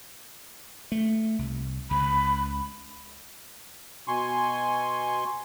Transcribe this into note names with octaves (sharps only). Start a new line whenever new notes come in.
A3
C2
C#2 B5
B2 G#5 C6 C#6